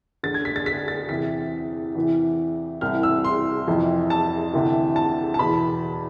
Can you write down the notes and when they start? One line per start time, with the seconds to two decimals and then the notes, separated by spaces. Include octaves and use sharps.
0.23 D2 D3 A6
0.34 G#6
0.45 B6
0.56 A6
0.66 B6
0.88 A6
1.09 E2 C3 E3 B6
1.95 E2 C3 E3
2.81 C2 C3 E3 F6
3.03 E6
3.25 C6
3.68 F2 C3 E3
4.10 A5
4.53 D2 C3 E3
4.96 A5
5.34 A5
5.39 E2 B2 B5